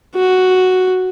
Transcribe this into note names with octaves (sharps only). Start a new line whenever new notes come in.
F#4